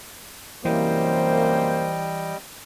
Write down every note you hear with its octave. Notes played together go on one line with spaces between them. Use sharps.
F#2 C3 E3 G3 A#3 C5 D#5 G5